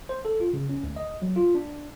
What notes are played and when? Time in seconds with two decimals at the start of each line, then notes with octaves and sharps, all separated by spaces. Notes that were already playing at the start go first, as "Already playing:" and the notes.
0.09 C5
0.25 A4
0.40 F4
0.53 C#3
0.69 C#4
0.83 D2
0.96 D#5
1.22 F#3
1.36 F4
1.55 D4